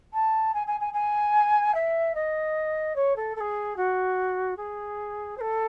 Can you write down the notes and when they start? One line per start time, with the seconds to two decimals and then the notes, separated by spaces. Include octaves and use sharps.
0.13 A5
0.54 G#5
0.67 G#5
0.80 G#5
0.93 G#5
1.74 E5
2.15 D#5
2.95 C#5
3.16 A4
3.35 A4
3.40 G#4
3.76 F#4
4.56 G#4
5.37 C5
5.40 A4